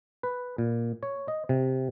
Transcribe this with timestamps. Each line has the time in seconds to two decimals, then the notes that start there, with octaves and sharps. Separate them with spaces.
0.23 B4
0.58 A#2
1.03 C#5
1.28 D#5
1.49 C3